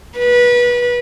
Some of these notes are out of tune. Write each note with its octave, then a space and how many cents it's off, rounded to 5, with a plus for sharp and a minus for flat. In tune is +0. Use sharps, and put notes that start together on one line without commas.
B4 -25